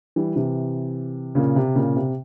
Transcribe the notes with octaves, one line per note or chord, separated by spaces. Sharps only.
E3 G3
C3 E3
A#2 C#3
C3
A#2 C#3
C3